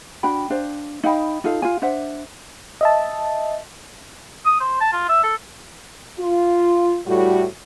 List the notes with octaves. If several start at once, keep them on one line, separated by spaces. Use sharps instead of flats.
D4 F#4 G5 B5
D4 C5 F5
D#4 F5 G5 B5
D#4 F4 A4 F5
F4 F5 G#5
D4 C5 E5 F#5
D#5 E5 A5
D#6
C5
A5
F4
E5
A4
F4
A2 G3 F#4